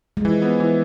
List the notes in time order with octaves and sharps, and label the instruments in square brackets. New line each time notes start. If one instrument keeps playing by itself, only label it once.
[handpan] G#3
[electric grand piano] E3 [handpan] F3
[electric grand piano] B3
E3